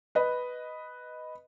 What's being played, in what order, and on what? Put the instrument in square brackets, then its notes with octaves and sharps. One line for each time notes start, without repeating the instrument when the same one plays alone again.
[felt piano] B4 D#5